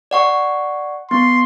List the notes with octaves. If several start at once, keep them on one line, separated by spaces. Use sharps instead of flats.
D5 F#5 C#6
B3 C6